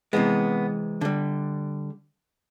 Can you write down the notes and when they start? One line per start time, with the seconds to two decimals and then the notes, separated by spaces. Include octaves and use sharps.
0.13 C3 E3 G#3 B3
1.01 D3 G3